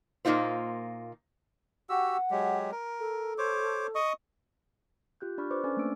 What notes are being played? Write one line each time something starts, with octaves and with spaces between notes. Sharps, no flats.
A#2 A#3 D#4 F4 C5
F#4 G4 F#5 E6
F#3 G#3 G4
A#4
A4
C5 C#5 D6
D#5 C#6 D#6
F4 G4 F#6 G6
D4 D5 B5 C#6 F6
B4 C5 D5 C#6 D6 F#6
C#4 A4 D5 G#5 D6 F6
A3 A#3 C4 D4 E6 D7